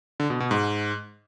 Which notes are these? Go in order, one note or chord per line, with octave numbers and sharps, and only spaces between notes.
D3
B2
B2
G#2